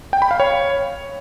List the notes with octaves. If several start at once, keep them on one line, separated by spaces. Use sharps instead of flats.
G5
B5
F5
C#5